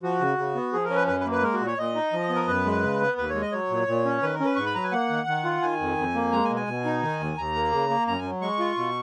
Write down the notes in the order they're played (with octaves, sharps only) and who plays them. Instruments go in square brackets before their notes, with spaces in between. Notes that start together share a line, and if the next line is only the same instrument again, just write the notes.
[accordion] F3 F#4
C#3
C#3
B3
F3 G#4
A#4
C#4
B4
F#2 B4
B4
A#3
B4
G#3 A#4
F#4
A#2
C#5
A#2 D#5
D#4
F3
B3
A#4
F#2 B4
G#3
C#3
B3
D#2 B4
C#5
G#3
D#5
F#3 C#5
A#2
A#2
C#4
D#3 B4
A#4
C#4
B4
G#2 C#6
B5
F#3 A#5
G#5
A#3 F#5
D#3
D#3
F4
D#3 G#5
F2
F2
A#3
G#3 A#5
G#5
B2
G#5
B2
D#4
D#3
D#2
D#2 A#5
A#3
C#3
A#3
F#2 A#5
G#5
F#3
G#3 C#6
F4
B2